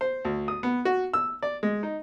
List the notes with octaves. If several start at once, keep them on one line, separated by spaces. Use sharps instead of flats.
C5
D2
D#6
B3
F#4
E6
D5
G#3
D#4